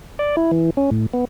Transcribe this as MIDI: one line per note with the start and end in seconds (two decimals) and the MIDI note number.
0.19 0.36 74
0.37 0.51 64
0.51 0.70 52
0.77 0.90 61
0.91 1.06 45
1.13 1.25 59